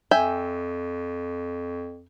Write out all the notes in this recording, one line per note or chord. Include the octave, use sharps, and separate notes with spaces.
F2 E5 G5 G#5